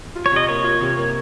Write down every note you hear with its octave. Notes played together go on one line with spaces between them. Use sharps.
F4
C#5
C3 D#5
A#3 C#5
F4
C3
A#3